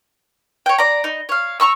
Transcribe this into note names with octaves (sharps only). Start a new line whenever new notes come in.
C#5 G5
D5 A#5
D#4
C#5 F5
A#5 B5 C#6 E6